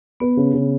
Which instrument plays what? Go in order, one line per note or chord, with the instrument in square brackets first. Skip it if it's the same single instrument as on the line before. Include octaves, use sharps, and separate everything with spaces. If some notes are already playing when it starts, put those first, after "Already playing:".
[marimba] B3 [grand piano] B4
[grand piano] C#3
C#3